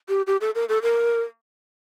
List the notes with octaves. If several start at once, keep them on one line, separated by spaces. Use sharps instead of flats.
G4
G4
A4
A#4
A4
A#4